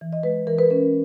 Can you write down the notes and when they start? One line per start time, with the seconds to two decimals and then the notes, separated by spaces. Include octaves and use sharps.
0.01 E3
0.13 D#5
0.23 G#3 B4
0.47 E3 A#4
0.59 B4
0.70 C#4 A#4